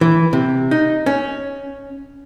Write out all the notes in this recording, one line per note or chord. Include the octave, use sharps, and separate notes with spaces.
E3
C3
D#4
C#4